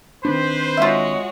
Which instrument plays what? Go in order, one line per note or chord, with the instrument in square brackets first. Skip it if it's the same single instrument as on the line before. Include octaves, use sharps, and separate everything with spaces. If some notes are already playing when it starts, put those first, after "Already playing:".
[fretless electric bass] D#3 C4 D4 [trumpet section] B4 C5
[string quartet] G#3 F#4 C#5 [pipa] F4 E5